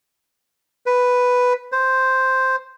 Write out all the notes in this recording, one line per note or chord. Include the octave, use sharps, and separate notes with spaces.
B4
C5